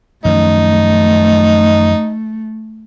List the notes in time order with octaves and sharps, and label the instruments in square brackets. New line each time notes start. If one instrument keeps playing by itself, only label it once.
[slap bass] F#2 D#3 F3 [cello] A3 [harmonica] D#4